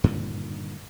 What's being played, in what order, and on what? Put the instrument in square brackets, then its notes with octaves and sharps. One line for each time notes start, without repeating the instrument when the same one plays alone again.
[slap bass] G2 A#2 D3 D#3